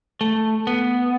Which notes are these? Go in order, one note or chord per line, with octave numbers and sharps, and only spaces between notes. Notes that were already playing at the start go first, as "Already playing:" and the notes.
A3
B3